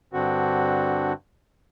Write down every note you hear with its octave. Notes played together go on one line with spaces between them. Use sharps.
G2 D3 C4 F#4